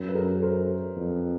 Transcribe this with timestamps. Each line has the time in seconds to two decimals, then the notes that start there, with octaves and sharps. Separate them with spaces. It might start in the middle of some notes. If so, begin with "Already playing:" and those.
Already playing: F#2
0.08 B4
0.15 G#4 A#4
0.42 A#4 C5
0.96 F2